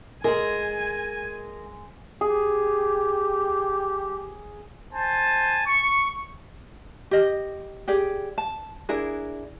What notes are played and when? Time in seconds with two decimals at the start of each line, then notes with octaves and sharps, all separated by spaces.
0.24 G#3 G#4 A#4 G#5 E6
2.21 G4 G#4
4.92 C5 G#5 A5
5.67 C#6
7.11 G4 D#5
7.88 G4 G#4 D5
8.38 A5
8.89 D4 E4 G#4 A#4